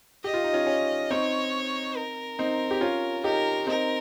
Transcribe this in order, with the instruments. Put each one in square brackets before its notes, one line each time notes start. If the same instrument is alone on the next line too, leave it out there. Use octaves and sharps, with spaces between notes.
[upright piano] G4 [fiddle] D#5
[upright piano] F4
D#4
C#4 F4
C#4
[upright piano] C4 D#4 [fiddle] C#5
[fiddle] A#4
[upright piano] C4 D#4
G4
C#4 F4
[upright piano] D#4 G4 [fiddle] A#4
[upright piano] C4 D#4 [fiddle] A#4